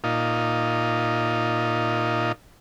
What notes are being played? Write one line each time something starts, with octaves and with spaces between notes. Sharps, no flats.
A#2 D#4 F4